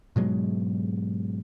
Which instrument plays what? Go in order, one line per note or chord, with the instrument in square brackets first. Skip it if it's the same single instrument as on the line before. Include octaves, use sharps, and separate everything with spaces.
[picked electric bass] G#2 B2 F#3 G#3